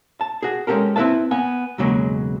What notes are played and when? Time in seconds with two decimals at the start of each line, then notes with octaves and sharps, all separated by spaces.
0.21 A5
0.43 F#4 G#4
0.67 G#3 C#4 D4 G4 A4 A#4
0.96 C4 E4 A#4 B4 E5 A5
1.31 B3 G#5
1.78 B1 E2 C#3 F#3 G#3 A#3